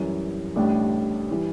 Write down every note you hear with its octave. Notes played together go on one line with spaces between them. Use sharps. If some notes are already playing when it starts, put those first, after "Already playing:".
Already playing: F#2 E3 G3
A1 A2 G3 D4
E3 G3